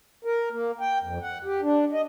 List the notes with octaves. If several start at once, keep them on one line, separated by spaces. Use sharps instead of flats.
A#4
A#3
G5
F2
F#5
G4
D4
D#5